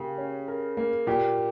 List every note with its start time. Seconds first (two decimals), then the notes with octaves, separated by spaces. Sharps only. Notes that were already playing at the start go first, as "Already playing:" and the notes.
Already playing: C#3 A#3 G4
0.18 C#4
0.48 A#4
0.77 A#3
1.07 A#2 G4